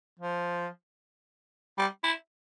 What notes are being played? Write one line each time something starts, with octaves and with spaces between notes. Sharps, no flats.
F3
G3
E4